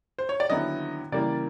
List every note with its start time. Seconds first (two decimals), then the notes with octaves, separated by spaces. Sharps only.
0.18 C5
0.29 C#5
0.40 D5
0.50 D#2 D3 F#3 B3 E4 D#5
1.12 C#3 E3 G3 A#3 D5